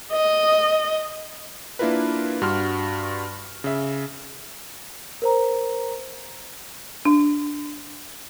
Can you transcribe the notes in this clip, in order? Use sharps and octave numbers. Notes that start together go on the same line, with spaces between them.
D#5
A#3 D4 E4 F4 A#4 B4
G2 F#4 C6 F6
C#3 E5
A#4 C5 A#5
D4